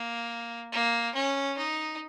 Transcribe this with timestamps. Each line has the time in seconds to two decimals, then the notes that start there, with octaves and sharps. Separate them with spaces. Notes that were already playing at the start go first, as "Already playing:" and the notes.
Already playing: A#3
0.72 A#3
1.14 C#4
1.58 D#4